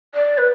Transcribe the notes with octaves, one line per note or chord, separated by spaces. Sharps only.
D5
B4